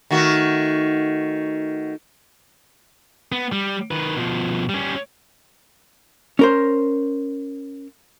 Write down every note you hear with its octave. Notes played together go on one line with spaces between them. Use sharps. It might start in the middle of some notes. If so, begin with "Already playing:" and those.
D#3 A3 F#4
B3
G3
D#3 B4
B2 F3
G3 C#4
C#4 A#4 C5